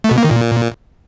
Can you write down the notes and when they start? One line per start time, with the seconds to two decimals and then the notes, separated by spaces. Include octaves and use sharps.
0.04 A3
0.11 B2
0.18 A#3
0.24 D#3
0.31 A#2